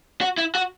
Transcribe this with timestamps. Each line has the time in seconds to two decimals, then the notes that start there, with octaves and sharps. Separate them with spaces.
0.21 F#4
0.38 E4
0.55 F#4